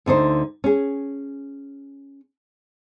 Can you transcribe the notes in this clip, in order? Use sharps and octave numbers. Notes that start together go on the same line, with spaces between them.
D2 D3 D#4 C5
C#4 G#4